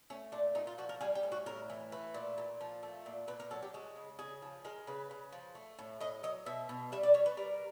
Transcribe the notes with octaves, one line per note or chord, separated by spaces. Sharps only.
A3 C#4
A#2 D4
A#2 D#4
F4
F3 F#4
A#4
G3 G#4
G4
A2
F#4
A2 A#4
E3
A3 B4
A#2
A#2
F3
A3
A#2
A#2 B4
A#4
F#3 A4
G4
G#3 F#4
C#3
C#3 G#4
F3
G#3 A#4
C#3 B4
C#3
F3
A3
A2
A2 D#5
F#3 D#5
B2 E5
B2
G3 E5
D5
G3 C#5
B4
G3 A#4